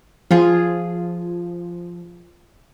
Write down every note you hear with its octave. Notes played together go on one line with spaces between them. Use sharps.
F3 F4 G#4